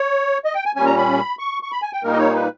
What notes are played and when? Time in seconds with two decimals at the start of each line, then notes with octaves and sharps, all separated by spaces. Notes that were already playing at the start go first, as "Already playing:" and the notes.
Already playing: C#5
0.45 D#5
0.55 G5
0.65 G#5
0.76 A#2 G3 C#4 G#5
0.86 A#5
0.97 B5
1.39 C#6
1.63 C#6
1.72 B5
1.82 G#5
1.93 G5
2.03 A#2 G3 A#3 D#4 A#4
2.11 D#5
2.19 C#5
2.35 B4